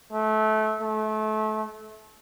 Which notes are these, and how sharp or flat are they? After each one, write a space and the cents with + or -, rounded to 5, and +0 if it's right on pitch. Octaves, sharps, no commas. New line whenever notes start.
A3 -25
A3 -30